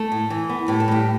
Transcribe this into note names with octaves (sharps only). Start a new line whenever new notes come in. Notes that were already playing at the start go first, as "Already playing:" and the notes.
Already playing: A3 A4
A2
E3
B3
A2 G4
A4
A2 G3 G4